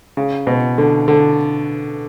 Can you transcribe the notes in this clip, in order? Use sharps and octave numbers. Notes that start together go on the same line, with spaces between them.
C#3
B2
D3
D3